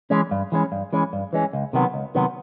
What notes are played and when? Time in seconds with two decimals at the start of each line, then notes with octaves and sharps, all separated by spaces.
0.10 E3 G#3 C#4
0.31 G2
0.52 E3 G#3 C#4
0.72 G2
0.93 E3 G#3 C#4
1.13 G2
1.33 E3 G#3 C#4
1.53 C#2
1.73 C3 D#3 F#3 B3
1.94 C#2
2.15 C3 D#3 F#3 B3